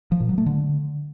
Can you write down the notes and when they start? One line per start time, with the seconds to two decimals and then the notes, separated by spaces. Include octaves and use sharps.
0.12 F3
0.20 A#2
0.29 F#3
0.38 A3
0.46 D3